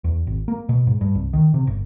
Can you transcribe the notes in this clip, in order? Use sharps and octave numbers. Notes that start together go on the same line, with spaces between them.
E2
G#1
A#3
B2
G#2
G2
C2
D#3
C3
G1